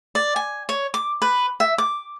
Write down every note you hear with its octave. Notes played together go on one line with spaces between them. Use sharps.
D5
G#5
C#5
D6
B4
E5
D6